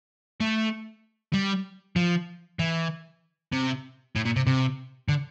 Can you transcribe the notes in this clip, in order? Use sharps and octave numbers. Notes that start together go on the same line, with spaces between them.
A3
G3
F3
E3
C3
A2
A#2
C3
C3
D3